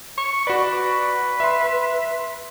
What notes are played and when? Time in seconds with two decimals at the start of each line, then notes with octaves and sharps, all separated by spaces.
0.17 C#6
0.47 F#4 B4 D5
1.40 E5 C6